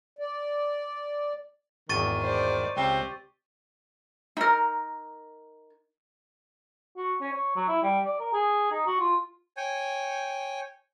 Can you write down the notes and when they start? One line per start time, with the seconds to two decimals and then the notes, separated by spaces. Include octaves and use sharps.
0.19 D5
1.89 G#1 E2 D#3 C#6 A6 D#7
2.22 C5 D5
2.77 C#2 C4 G4
4.37 D#4 A#4
6.97 F#4
7.21 C#4
7.32 C#5
7.56 F#3
7.68 E4
7.82 G3
8.05 D5
8.19 A#4
8.33 G#4
8.71 D#4
8.86 F#4
9.00 F4
9.57 C#5 G5 G#5